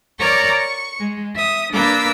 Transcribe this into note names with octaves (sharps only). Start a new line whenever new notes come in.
A#4 C#5 D5 A#5 C#6 D6
C#6
G#3
E5 D#6
A#3 D4 B4 D6 E6